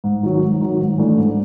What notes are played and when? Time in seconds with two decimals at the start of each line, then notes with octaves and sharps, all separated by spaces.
0.04 G#2
0.23 D#3 F#3
0.42 G#2
0.61 D#3 F#3
0.80 G#2
0.98 E3 A3 D4
1.17 G#2